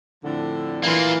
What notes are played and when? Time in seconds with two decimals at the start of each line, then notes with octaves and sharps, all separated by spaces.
0.24 F2 A2 D3
0.83 E3 A#3 F4